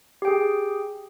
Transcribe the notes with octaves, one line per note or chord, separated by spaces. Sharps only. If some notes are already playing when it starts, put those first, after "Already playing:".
G4 G#4 G5